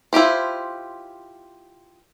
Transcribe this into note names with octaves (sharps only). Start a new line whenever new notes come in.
E4 F4 G4 C5